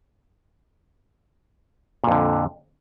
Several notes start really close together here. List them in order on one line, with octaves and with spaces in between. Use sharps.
A#2 F2 D3